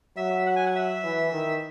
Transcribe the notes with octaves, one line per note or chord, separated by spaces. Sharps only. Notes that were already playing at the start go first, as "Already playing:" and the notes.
F#3 E5
F#5
G#5
F#5
E5
E3
D#3